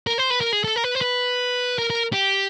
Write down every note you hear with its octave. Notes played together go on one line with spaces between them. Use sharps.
A#4
C5
B4
A#4
G#4
A4
A#4
B4
C5
B4
A#4
A#4
G4